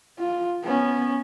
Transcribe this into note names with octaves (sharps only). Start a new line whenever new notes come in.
F4
B3 C#4